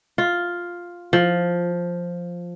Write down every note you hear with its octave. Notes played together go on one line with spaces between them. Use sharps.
F4
F3